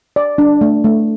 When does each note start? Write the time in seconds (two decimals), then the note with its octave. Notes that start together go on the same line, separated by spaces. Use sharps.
0.16 D5
0.38 D4
0.61 A3
0.84 A3